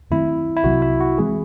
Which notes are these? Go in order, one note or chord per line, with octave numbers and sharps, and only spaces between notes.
F#2 D#3 A3 C4 E4
E4
C2 C3 F#3 F#4
E4
F#4
E3 G#3 C4 G#4